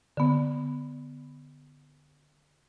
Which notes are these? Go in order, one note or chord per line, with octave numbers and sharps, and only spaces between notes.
D3 B3